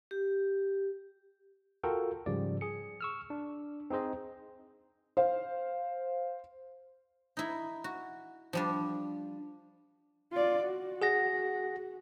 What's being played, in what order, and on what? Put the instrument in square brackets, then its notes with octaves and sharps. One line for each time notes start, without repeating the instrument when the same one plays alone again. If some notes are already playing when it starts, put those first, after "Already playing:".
[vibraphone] G4
[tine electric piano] F4 F#4 A4 A#4 G5
G#2 C#3 F3 G3 D5
G#4 C#7
C#6 E6 F6
D4
C4 D#4 G#4 C5 D#5
[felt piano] C5 F5
[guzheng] D#4 E4
F#4
F3 G3 D4
[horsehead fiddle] F4 D5
F#4
[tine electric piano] G#4 F#5 A#6